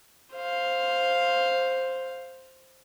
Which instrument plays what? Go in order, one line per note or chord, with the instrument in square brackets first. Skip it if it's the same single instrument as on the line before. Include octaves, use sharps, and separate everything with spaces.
[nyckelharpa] C5 F5